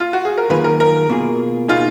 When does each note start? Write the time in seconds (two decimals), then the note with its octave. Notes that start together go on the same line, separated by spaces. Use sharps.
0.00 F4
0.13 F#4
0.25 G#4
0.38 A#4
0.50 F#2 D#3 A#3 F4 G#4 B4
0.64 A#4
0.80 A#4
1.09 B2 A#3 F4 G#4
1.68 B2 A#3 D#4 F4 G#4